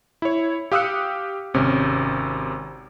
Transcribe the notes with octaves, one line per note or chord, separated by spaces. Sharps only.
E4 C#5
G4 F5 D#6 E6 F#6 C#7
G#1 C3 C#4